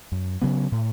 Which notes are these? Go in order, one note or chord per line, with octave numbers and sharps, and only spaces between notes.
F#2
C#3 F#3 B3
A2